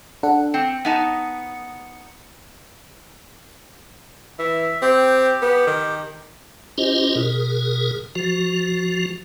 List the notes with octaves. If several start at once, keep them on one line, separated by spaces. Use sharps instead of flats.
D4 A4 F#5
C4 C#7
B3 D#4 A5
E3 E5
C4 G4
B3
D#3
C#4 E4 F4 G4 C5 D#5
B2 G#4 A#4
F3 F#4